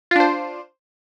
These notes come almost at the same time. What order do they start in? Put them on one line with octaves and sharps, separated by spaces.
F4 D4 C5